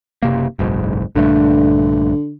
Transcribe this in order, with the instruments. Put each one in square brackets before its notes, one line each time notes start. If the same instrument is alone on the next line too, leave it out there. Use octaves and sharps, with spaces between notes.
[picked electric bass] F#1 C3 A#3
F#1 B1 G#2
[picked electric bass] A#1 G2 A3 [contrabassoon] D3